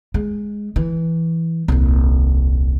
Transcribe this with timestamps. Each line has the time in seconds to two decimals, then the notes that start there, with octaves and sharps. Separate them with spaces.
0.14 G#3
0.76 E3
1.68 D#1 C2